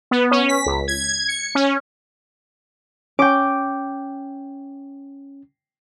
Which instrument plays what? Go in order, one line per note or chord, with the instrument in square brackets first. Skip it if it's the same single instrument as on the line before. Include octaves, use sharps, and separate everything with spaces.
[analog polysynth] B3
C#4
B6
C#2
G#6
C#7
C#4
[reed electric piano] C#4 [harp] G5 D6